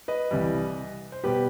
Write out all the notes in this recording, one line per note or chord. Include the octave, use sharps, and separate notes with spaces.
B4 D#5
C2 C3 E3 G3
C5
B2 G3 G4 B4